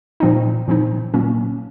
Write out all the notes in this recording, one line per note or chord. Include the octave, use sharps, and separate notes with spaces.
A#2 F3 C4 D#4
A#2 F3 C4 D#4
A#2 F#3 A#3 C#4